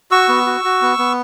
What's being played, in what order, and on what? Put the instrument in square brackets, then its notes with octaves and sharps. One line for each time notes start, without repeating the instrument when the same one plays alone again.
[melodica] F#4 C#6 E6
B3
F#4
F#4
B3
B3